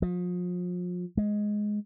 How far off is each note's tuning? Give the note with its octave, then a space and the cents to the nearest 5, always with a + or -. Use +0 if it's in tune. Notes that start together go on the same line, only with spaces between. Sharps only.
F3 +35
G#3 +5